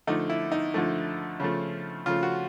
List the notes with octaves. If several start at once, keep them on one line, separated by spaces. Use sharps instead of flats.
D3 F3 A3 D#4
E4
D#4
D3 F3 A3
C#3 F3 A3
C#3 F3 A3 F4
F#4